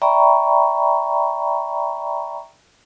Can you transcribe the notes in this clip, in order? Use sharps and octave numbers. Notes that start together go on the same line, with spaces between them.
D5 E5 G5 A#5 B5 C#6